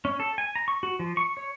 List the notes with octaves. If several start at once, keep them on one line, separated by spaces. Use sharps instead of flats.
C#4
A4
G#5
A#5
C#6
F#4
F3
C#6
C#5